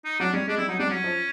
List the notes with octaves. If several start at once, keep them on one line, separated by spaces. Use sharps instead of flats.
D#4
F#3 D4
G3 C#4
G#3 D4
G3 E4
F#3 D#4
G3 D4
F#3 C#4
F3